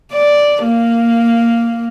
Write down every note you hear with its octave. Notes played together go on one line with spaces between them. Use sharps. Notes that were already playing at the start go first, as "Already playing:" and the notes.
D5
A#3